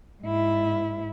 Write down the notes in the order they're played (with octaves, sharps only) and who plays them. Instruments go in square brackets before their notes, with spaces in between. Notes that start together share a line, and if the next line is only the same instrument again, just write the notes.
[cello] G#2 E4